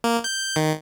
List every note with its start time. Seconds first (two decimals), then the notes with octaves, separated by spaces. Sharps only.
0.04 A#3
0.24 G6
0.56 D#3